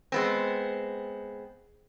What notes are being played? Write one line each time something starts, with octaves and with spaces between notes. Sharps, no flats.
G#3 B3 C4